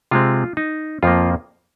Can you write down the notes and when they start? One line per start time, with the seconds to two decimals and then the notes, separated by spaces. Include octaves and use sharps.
0.11 C3 G#3 C4 F4
0.57 D#4
1.03 F2 F3 A#3 F4